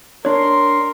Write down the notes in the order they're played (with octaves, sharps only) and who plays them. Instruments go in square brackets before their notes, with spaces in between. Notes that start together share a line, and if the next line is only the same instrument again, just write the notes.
[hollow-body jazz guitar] D4 C#5 [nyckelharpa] A#4 [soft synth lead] C6